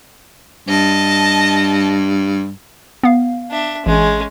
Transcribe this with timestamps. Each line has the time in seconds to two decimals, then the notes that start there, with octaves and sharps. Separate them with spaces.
0.68 G2 D#5 A5
3.03 B3 F5
3.51 D4 E5
3.86 A1 G#3 C#4